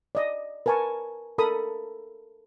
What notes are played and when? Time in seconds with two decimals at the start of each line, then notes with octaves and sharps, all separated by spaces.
0.15 D5 D#5
0.66 A#4 B4 G#5 A5 C#6
1.38 A4 A#4 B5 D#6